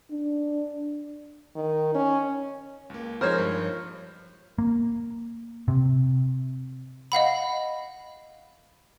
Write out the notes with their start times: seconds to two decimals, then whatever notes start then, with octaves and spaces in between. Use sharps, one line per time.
0.11 D4
1.56 D#3
1.95 C#4
2.90 C#2 A#3
3.21 F3 G#3 D#4 A#4 C5 C#5
3.35 G2 F3
4.58 A#3
5.68 C3
7.12 D#5 F5 F#5 B5